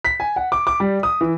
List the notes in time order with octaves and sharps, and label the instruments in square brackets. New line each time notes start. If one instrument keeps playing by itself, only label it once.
[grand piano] B6
G#5
F#5
D6
D6
G3
D#6
E3